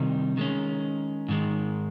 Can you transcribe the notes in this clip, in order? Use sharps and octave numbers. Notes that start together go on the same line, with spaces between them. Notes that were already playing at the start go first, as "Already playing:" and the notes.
Already playing: C3 D#3 G3 C4 D#4
D#3 G#3 C#4
G#2 D#3 G#3